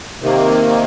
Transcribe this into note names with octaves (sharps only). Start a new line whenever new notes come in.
C3 D#3 A#3